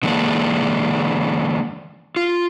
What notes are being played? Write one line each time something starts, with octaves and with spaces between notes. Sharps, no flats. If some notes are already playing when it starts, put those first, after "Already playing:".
D3 E3 G#3 A#3 D4
F4